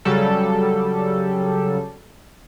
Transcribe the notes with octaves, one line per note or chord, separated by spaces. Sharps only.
C#3 F#3 G3 A4